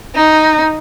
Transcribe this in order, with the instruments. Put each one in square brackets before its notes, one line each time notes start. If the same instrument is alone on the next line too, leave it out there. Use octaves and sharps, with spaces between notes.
[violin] D#4